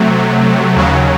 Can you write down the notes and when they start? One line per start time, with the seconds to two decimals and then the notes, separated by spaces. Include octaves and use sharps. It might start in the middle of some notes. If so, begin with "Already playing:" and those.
Already playing: C3 F#3 A3
0.76 D#2 C#3 F#3